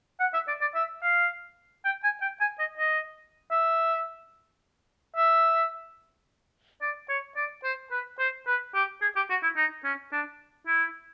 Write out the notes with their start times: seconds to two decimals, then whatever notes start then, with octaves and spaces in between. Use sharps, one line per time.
0.20 F#5
0.34 E5
0.48 D5
0.61 D5
0.75 E5
1.03 F5
1.85 G5
2.04 G#5
2.22 G5
2.41 G#5
2.59 D#5
2.78 D#5
3.51 E5
5.16 E5
6.82 D5
7.09 C#5
7.37 D5
7.64 C5
7.91 B4
8.19 C5
8.47 B4
8.75 G4
9.02 G#4
9.16 G4
9.30 F#4
9.43 E4
9.57 D#4
9.85 C#4
10.12 D4
10.67 E4